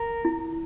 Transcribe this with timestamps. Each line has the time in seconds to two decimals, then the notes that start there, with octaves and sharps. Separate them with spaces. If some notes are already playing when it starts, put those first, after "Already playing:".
Already playing: A#4
0.25 E4